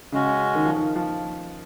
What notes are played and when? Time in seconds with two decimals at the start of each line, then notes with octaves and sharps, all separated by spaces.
0.12 C#3 G#3 C#4 F#4
0.55 D#3
0.65 F3
0.76 D#3
0.96 F3